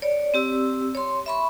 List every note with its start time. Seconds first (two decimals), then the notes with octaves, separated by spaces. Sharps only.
0.02 C#5 D5
0.34 C4 G4 E6
0.95 C#5 C6
1.26 E5 B5 C#6